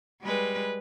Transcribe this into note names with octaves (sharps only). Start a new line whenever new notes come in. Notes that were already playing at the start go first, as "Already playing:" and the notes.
G3 G#3 B4